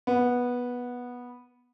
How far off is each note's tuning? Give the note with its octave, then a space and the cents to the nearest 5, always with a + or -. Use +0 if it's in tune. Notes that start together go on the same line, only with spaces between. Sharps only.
B3 -10